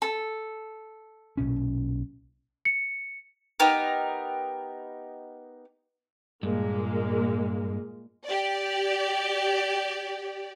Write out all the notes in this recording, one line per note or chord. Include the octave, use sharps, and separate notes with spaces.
A4
B1 A#2 C#4
C#7
B3 D#4 G4 A#4
G2 A#2 G#3 A#3
G4 D5